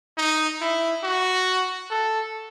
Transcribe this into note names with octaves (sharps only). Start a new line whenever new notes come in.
D#4
E4
F#4
A4